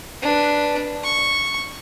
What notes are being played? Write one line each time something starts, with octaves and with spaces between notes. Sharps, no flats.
D4 B4
C#6